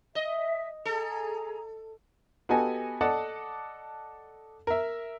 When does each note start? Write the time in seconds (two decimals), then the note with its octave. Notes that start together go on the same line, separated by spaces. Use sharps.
0.15 D#5 E5
0.85 G#4 A4 A#5
2.49 B3 F#4 G4 A4 D#5 G#5
3.01 A4 D5 D#5 F#5 A5
4.67 A#4 E5